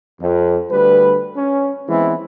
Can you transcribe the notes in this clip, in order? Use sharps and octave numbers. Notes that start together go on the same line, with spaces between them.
F2
D2 G3 B4
C#4
E3 G#3 B3 C4 E4